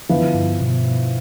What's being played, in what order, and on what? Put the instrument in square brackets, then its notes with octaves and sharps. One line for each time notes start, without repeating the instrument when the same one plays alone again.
[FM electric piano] D3 [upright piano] F3 B3 E4
[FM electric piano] D3
G2
B2